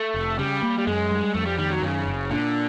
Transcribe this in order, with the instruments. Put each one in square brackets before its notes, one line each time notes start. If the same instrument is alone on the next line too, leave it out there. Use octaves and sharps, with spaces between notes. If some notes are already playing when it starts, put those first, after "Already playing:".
Already playing: [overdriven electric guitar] A3
[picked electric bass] F1
[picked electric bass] C#3 [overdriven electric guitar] G3
[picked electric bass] A#3
[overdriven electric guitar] G3
[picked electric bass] F#2 [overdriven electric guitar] G#3
[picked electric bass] G3
[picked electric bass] F2 [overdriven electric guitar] A3
[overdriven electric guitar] G3
[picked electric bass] D#3 [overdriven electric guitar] G3
[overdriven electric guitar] F#3
[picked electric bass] F#2 [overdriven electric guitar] C#3
[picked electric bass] F#1
[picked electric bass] A#2 [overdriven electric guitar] D3